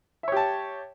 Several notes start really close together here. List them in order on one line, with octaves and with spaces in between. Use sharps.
E5 C#5 G4 A5